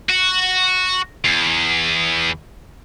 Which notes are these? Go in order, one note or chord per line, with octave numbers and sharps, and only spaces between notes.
F#4
E2